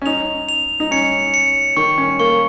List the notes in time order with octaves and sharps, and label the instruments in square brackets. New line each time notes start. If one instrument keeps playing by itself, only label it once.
[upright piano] C#4
[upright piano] D#4 [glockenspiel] F7
[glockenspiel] F7
[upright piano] D#4
[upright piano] C#4 [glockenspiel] C#7
[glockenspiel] C#7
[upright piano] D#3 [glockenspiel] C#6
[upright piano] C#4
[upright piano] A#3 [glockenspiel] C#6